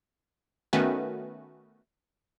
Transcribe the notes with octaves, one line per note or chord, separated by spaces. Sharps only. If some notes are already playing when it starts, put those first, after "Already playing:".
D#3 A3 B3 C#4 F#4 B4